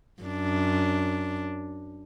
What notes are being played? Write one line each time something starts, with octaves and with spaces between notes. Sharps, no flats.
F#2 D4